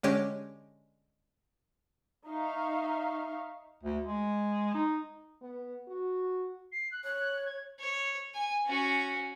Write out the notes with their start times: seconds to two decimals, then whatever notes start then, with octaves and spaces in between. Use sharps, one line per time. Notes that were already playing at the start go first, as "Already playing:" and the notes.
0.03 D3 G#3 C#4 G4 C#5
2.27 D#4 E5 F5 C#6
3.83 D2
4.05 G#3
4.74 D#4
5.42 B3
5.88 F#4
6.72 C7
6.91 F#6
7.04 C#5 F#6
7.45 G#6
7.80 C#5
8.34 G#5
8.66 C#4 F#4